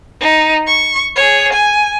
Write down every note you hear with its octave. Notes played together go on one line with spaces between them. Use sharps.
D#4
C#6
G#4 C#5
G#5